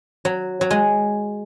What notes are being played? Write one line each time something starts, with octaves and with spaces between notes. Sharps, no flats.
F#3
F#3
G#3